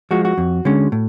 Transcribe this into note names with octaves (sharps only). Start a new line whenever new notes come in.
F3 G#3 F#4
F#4
F2
D3 G#3 C#4
A2